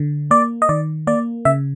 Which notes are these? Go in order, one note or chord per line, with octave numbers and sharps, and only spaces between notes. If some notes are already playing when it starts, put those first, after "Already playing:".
Already playing: D3
A#3 D5
D#5
D#3 D5
A#3 D5
C#3 E5